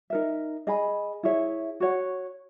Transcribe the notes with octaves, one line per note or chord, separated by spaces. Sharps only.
D#4 A#4 E5
G#4 D#5 G#5 B5
E4 G#4 C#5 E5
F#4 C#5 F#5